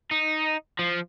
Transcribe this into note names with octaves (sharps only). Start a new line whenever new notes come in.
D#4
F3